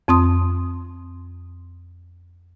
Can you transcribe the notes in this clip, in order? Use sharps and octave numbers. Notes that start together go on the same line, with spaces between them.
F2 C4 C6 D#6